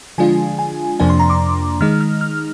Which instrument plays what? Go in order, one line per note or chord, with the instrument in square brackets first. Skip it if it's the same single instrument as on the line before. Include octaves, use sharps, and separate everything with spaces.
[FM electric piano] D3 F3 G#3 D4 F4 G#5
G#5
F2 C3 F3 A#3 D4 G#5
C6
A#5
D6
D#3 G#3 D#4 F6
F6
F6